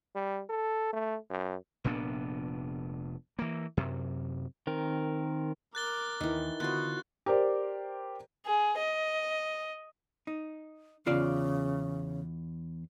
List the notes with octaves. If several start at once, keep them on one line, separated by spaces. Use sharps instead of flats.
G3
A4
A3
F#2
F1 A#2 B3 D4
E3 A#3
F#2 C3
D#3 C4 A#4
A#4 D6 F#6 A6 G7
D#2 D#3 E3
D3 B3 F4 F#4 C5 F#6 A6
G4 A#4 C5 D5
G#4
D#5
D#4
E2 C#3 F4 D5